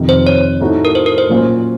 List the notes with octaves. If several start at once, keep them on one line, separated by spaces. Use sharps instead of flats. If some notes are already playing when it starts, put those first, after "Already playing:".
Already playing: F2 C3 D#3
C5
C#5
A2 A3 D#4 F#4
A#4
C5
A#4
C5
A#2 F#3 A#3 C#4 F4